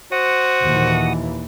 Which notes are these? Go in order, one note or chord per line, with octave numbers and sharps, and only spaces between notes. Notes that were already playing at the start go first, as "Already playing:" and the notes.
F#4 C5 F#5 D#6
D#2 A#2 E3